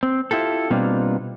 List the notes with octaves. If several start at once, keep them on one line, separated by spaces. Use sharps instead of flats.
C4
E4 F4 G4 A4
B2 G3 A#3 C4 D4 F4